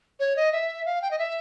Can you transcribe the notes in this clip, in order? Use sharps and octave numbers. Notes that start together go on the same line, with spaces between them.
C#5
D#5
E5
F5
G5
D#5
E5